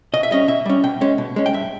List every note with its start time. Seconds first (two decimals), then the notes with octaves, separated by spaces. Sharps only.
0.14 B2 D#5
0.23 E5
0.31 G3 C#4 D#5
0.48 B2 E5
0.66 G3 C#4
0.84 B2 G5
1.01 G#3 C#4
1.18 B2
1.36 G#3 C#4
1.46 G5
1.53 G2 E5